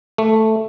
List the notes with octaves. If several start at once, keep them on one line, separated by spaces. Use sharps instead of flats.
A3